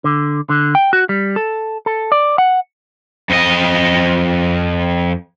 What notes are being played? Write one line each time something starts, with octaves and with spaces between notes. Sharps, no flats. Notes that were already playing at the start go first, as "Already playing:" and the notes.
D3
D3
G5
F#4
G3
A4
A4
D5
F#5
F2 D#5